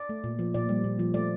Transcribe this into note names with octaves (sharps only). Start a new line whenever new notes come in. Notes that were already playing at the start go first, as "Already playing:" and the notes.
Already playing: D5
A3
A#2
F3
A#2 D5
G3
A#2
F3
A3 D5